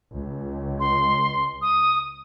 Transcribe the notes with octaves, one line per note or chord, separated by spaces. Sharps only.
C#2
C6
D#6